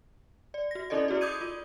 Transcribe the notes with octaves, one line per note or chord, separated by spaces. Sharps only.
D5
F#4 A#6
C#4 D#4 E4 A4 D5 D#5
E4 F#4 G#4 D5
D6 D#6 G6 G#6 D#7
F4